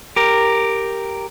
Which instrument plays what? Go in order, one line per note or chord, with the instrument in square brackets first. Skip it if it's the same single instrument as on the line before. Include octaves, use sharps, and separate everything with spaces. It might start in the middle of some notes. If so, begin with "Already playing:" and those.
[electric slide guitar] G4 A#4